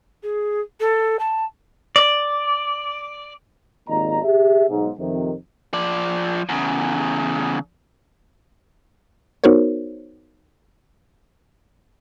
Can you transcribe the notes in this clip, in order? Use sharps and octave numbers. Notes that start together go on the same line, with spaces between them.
G#4
A4
A5
D5
G#1 D#2 A#2 D#5 A#5
G4 G#4 E5
B1 G#2
F2 C3 D#3
F3 D5
E2 C#3
B3 D#4 F#4 A#4 C5 C#5